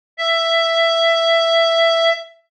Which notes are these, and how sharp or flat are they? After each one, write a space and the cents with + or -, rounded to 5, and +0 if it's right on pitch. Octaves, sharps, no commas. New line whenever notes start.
E5 +10